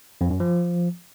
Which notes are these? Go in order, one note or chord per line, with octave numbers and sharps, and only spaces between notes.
F2
F#2
F3